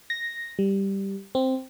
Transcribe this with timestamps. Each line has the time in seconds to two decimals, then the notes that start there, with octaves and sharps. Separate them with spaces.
0.10 A#6
0.59 G3
1.35 C4